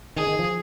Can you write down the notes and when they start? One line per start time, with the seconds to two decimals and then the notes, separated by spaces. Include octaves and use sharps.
0.16 D#3 G#4
0.27 D#3
0.39 F3